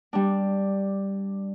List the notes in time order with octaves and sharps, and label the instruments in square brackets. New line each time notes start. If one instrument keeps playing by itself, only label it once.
[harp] G3 D4